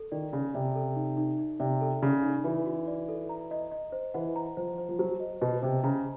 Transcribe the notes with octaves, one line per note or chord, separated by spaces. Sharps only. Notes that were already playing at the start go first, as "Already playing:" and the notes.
Already playing: A4
D#3 D5
C#3 D5
C3 D5
A4
D#4
D#4
D#4
C3 D5
A4
C#3 D5
D#4
E3 F#4
F#4
D5
A4
A#5
D#5
D#5
C5
E3 F#5
A#5
F3 C5
C5
F3
F#3 C5
D#5
B2 D#5
C3 C5
C#3 A#5